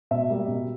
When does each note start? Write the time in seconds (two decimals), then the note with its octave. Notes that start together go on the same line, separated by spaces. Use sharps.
0.11 B2 E5
0.30 G3 A#3
0.47 B2